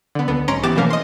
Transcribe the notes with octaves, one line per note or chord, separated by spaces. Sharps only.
D3 B3
C#2 D3 B3
B1 G#2 C#4 A#5 C6 D7
E3 B3 G4 D6 A6 E7
B2 E3 F3 A3 A#3 C#4
D#5 C6